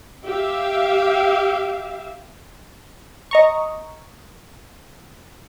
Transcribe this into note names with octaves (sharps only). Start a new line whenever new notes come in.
G4 E5 F5
D#5 A#5 C#6